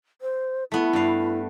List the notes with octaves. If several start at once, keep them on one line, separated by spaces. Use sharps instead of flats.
C5
A3 B3 E4
G2 F5